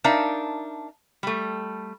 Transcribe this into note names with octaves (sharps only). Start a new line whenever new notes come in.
D4 D#4 A#4 E5 F5 A5
G3 A3